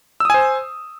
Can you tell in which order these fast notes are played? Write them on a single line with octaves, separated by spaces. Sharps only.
E6 D#6 G#5 C5